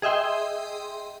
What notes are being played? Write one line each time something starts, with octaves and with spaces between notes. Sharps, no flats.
G#4 D#5 E5 G5 C6